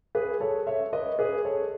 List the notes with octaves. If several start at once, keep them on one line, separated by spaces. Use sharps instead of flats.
G#4 B4
A4 C#5
C#5 E5
B4 D#5
G#4 B4
A4 C#5